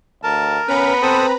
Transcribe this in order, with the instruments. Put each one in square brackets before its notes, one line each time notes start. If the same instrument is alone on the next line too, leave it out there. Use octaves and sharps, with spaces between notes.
[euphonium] D2 [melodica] A#4 [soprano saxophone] A5
[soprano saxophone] B3 [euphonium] C#4 [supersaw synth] B4 A#5 B5
[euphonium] C4 [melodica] A4 C5 D#6